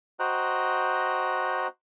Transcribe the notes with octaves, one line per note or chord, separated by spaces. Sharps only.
F#4 C5 D#5 G5 A#5 F#6